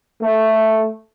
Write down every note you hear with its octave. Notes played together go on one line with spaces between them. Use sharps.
A3